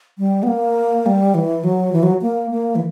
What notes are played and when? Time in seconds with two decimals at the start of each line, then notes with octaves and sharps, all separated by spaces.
0.18 G3
0.43 B3
0.48 A#3
1.06 G3
1.35 E3
1.64 F#3
1.93 E3
2.03 F#3
2.22 A#3
2.51 A#3
2.76 E3